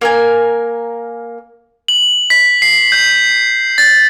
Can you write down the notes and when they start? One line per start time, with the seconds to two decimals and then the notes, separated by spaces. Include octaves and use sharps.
0.01 A#3 A#4 G#5
1.88 F#7
2.30 B6
2.62 C7
2.92 G6
3.78 A6